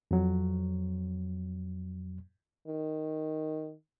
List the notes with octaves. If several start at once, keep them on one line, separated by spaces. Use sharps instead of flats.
F2 F#3
D#3